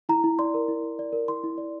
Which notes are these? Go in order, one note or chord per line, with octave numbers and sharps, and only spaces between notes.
E4 A#5
E4
D5 C6
A#4
E4
E4
D5
A#4
E4 C6
E4
D5